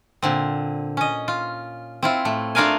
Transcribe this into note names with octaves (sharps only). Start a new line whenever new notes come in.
A#2 D3 C4
C#4 D#5
F4
C4 E4 F4
A2 A3
A3 D4 F4 A#4 F5 G#5